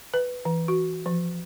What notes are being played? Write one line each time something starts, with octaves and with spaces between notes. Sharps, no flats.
B4
E3
F#4
F3